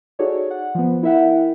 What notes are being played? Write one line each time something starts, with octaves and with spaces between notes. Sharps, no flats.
D#4 F#4 G#4 A4 C#5 D5
F#5
F3 B3
E4 A#4 E5 F#5 G5